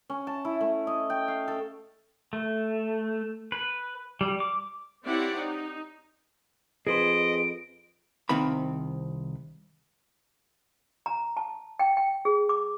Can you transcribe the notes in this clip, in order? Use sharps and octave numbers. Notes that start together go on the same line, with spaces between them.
C#4
A5
E4
A3
D#5
G5
F5
A4
A3
B4
G3
D6
C4 E4 G4 C#5 D5 F#5
D#4
F2 G#4 B4 C5 D#5 D7
C2 D#3 C4 F5 B5
A#5
A5
G5
G5
G#4
D6